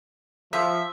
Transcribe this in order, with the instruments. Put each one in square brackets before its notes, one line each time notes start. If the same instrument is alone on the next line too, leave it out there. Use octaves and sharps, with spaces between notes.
[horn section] F3 [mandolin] E5